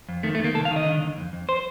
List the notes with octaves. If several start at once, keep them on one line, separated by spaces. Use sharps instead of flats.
F2
D#3 A3
A3
D#3
A#3
C2 A4
F5
D#3
D#5
D3
D#2
F2
F2
C5